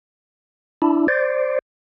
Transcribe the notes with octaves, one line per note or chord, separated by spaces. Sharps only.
D4 E4
C5 D5